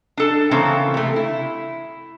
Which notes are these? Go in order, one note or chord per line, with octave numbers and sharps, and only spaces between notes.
D4 A4 A5
C#3 E3 A#3 C4 E4 A4
C3 A3
E4